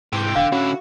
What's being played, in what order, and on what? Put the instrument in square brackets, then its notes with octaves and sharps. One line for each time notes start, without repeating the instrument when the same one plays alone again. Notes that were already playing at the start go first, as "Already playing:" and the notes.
[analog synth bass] G#2 [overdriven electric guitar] C3 E3 [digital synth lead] G5
[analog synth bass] E1 [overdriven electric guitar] D3 [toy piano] F5
[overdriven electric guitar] D3 E4 [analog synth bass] C#4 [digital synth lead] F#4